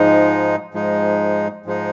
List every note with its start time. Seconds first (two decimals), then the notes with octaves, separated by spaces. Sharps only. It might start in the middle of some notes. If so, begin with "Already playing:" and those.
Already playing: G#2 F3 G#3 D#4
0.74 G#2 F3 G#3 D#4
1.66 G#2 F3 G#3 D#4